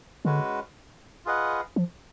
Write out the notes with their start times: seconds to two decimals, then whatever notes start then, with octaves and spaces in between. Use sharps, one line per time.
0.25 D3 G#3 C#4 F#4 B4
1.25 F4 G#4 B4 D#5 F#5
1.76 F3